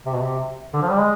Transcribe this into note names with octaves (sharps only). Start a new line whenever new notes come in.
C3
B2
C3
D3
F3
G3
G#3